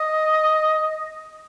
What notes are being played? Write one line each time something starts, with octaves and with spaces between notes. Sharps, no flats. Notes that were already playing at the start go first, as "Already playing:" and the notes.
Already playing: D#5